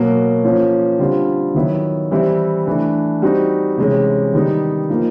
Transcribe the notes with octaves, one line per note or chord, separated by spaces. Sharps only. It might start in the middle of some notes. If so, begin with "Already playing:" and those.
Already playing: B2 F#3 A#3
F3 A#3 C#4
D3 G3 C4 F4
D#3 F#3 B3 E4
E3 G3 C4 E4
E3 A3 D4
G3 C4 D#4 F#4
C3 E3 G#3 C#4
D#3 G3 B3 D#4
F3 A#3 D#4